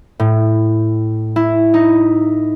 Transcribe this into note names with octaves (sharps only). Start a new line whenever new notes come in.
A2
E4
D#4